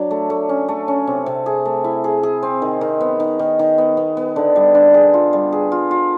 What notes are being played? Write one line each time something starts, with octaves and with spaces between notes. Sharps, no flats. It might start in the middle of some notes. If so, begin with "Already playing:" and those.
Already playing: F#3 D4
A3
A3
C#4
A3
C#4
C3
C3
G#4
A3
E4
G#4
G#4
C4
D#3
D#3
B3
D#3
D#3
D#3
B3
B3
B3
D3
G3
D3
G#4
F4
G3
G#4
F4
F4